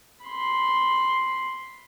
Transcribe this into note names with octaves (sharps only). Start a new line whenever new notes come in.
B5 C6